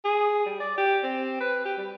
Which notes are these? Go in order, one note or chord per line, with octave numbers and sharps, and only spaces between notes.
G#4
G3
D5
G4
C4
B4
G4
G3